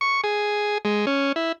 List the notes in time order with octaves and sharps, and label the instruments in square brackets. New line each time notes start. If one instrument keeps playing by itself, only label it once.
[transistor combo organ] C#6
G#4
G#3
C#4
E4